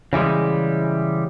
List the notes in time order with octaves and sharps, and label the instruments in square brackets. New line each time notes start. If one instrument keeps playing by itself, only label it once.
[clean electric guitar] C#3 E3 G3 G#3